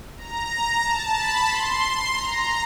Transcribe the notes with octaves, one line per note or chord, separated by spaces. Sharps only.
A#5
A#5
A5
B5
C6
C6
A#5